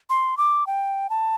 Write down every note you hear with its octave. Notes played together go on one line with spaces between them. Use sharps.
C6
D6
G5
A5